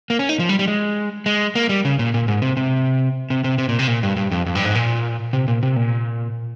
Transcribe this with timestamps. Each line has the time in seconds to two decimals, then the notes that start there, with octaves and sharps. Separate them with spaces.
0.10 A#3
0.19 C#4
0.29 D#4
0.39 F3
0.49 G3
0.59 G3
0.68 G#3
1.26 G#3
1.55 A#3
1.69 G3
1.85 C#3
1.99 A#2
2.14 A#2
2.28 G#2
2.42 C3
2.57 C3
3.30 C3
3.44 C3
3.58 C3
3.69 A#2
3.79 C3
3.88 A#2
4.03 G2
4.16 G2
4.31 F2
4.46 F2
4.55 G2
4.65 G#2
4.75 A#2
5.33 C3
5.48 A#2
5.63 C3
5.76 A#2